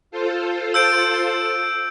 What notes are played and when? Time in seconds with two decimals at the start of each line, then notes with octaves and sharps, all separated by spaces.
0.11 F4 A4 C5
0.74 E6 G6 D7